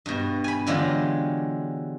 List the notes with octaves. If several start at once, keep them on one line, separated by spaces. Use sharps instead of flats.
G2 B2
G#5 B5
D3 E3 F#3 G#3 F4 G4